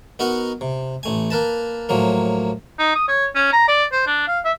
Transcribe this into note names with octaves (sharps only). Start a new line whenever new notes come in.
B3 D#4 F#4 A#4 D#5 F#5
C3
A1 A3 G#5
A#3 A#4 B4 A5
A2 F3 F#3 A#3
D#4
D#6
C#5
C#4
A#5
D5
C5
D4
F5
E5